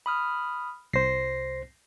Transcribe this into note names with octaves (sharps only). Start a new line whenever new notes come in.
B5 D#6 F6
C2 C5 A#6 C7